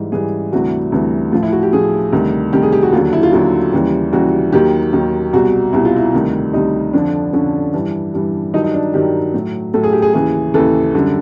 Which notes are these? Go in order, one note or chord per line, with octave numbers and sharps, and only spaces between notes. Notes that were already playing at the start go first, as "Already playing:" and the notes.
Already playing: G#2 E3 G3
G#2 E3 G3 G#4
D2 C3 E3 G3 F#4
D2 C3 E3 G3
A2 F3 F4
E4
F#4
G4
A2 F3 G#4
D2 C3 D#3 G3
D2 C3 D#3 G3 G4
G#4
G4
F#4
D#2 D3 F#3 F4
E4
F4
D#2 D3 F#3 F4
D#2 C#3 E3 G3
D#2 C#3 E3 G3 F#4
D#2 D#3 F#3 G4
D#2 D#3 F#3
C2 B2 G3 F#4
C2 B2 G3 E4
F4
E4
D2 C3 D#3 G3
D2 C3 D#3 G3 D#4
F2 D3 F3 D4
F2 D3 F3 C#4
G2 E3 G3
G2 E3 G3
G2 D#3 F#3 D#4
D#4
D4
G2 D#3 F#3 G4
A2 F#3
A2 F#3 A4
G#4
G4
G#4
D#2 C#3 E3 G#4
D#2 C#3 E3 A4
F#2 D3 G3